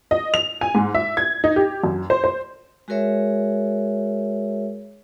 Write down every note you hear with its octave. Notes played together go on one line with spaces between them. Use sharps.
D#5
F7
G#5
G#2
E5
G#6
D#4
G4
F#2
C5
C5
G#3 F#4 G#4 A#4 C#5 E5